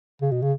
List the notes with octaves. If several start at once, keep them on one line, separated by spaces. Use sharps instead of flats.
C#3
B2
C#3